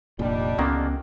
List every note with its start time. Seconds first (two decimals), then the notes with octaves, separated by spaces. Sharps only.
0.19 F1 A#2 G3 D4 D#4
0.58 C#2 D3 D#3 A#3 B3 C#4